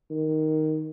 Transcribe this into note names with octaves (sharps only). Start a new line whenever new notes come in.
D#3